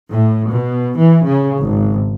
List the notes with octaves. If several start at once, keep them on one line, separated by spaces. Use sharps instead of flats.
A2
B2
E3
C#3
G#1